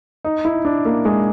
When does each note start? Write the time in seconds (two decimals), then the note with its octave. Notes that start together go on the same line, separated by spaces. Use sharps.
0.25 D#4
0.45 E4
0.65 D4
0.85 A#3
1.05 G#3